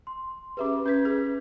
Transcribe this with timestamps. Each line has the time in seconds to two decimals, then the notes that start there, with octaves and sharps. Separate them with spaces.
0.07 C6
0.57 C#4 G4 G#4 B4 E5 D6
0.86 C#4 B4 G6 G#6 B6
1.05 G#4